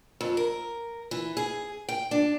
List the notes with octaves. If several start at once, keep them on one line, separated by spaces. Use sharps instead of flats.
F2
A#4
E3
G#4
G5
D4